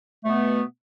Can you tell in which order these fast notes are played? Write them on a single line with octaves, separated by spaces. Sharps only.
A3 B2 B3